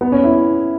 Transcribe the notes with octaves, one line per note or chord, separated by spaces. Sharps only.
B3
C#4
E4